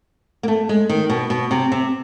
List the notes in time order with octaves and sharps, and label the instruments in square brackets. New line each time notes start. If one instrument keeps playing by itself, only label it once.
[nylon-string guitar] A#3
A3
G#3
D#3
B2
B2
C3
C3